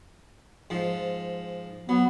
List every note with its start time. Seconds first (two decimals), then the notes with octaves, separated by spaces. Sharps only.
0.70 G#2 F3
1.89 F#3 B3